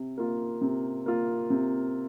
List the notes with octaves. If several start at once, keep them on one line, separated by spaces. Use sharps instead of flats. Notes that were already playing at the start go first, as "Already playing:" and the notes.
Already playing: C3
A#3 F4
C3
A#3 F4
C3